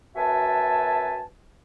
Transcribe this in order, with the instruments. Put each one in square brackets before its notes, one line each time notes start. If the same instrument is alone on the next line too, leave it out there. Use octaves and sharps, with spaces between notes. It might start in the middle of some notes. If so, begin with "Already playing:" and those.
[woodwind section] F#2 F#4 B4 E5 G#5 A5